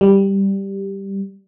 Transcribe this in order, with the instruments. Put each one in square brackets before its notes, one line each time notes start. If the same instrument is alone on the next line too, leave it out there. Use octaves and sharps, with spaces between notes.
[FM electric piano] G3